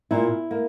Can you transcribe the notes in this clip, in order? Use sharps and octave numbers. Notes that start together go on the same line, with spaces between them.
A#2 E4
A#3